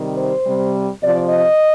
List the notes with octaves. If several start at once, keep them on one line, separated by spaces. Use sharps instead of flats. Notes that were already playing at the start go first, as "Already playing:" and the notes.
Already playing: C3 D#3 G3
C5
C3 G3
C3 F3 D5
D#5